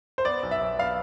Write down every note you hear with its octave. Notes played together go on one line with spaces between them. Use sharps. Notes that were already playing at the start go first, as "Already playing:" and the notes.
C5
B3 D5
B1
E5
B1
B3 F5